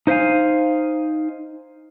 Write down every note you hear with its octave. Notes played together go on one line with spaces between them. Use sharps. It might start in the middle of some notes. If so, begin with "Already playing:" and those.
D#4 C5 E5 F5 G#5